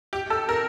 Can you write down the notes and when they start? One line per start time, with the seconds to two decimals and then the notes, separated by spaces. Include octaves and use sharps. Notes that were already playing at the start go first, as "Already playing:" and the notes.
0.13 G4
0.30 A4
0.49 A#4